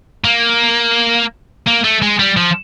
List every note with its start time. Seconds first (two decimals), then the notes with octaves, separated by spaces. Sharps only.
0.24 A#3
1.67 A#3
1.84 A3
2.02 G#3
2.19 G3
2.37 F3